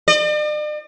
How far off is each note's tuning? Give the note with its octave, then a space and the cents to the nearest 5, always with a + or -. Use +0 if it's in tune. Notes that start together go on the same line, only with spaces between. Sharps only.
D5 +45